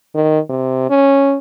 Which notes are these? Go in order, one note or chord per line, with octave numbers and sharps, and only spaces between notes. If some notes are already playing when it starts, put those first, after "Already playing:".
D#3
C3
C#4